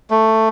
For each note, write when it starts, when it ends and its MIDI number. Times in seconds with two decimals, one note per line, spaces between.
0.10 0.49 57